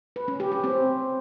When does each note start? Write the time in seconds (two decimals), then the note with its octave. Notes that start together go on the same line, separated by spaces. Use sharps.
0.16 B4
0.28 C#4
0.40 G4
0.52 G4
0.64 C4